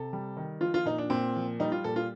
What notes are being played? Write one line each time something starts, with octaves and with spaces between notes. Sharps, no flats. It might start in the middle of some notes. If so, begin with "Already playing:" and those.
Already playing: C3 A4
G3
D#3
F3 F4
F4
A#2 D#4
D4
A#2 C4
F3
G3 D#4
F4
A#2 A4
F4